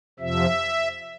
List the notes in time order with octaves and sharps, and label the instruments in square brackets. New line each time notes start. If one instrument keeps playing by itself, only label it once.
[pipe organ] F2 C3 F3 E5